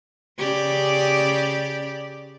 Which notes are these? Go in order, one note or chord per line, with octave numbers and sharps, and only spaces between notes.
C#3 G4 D5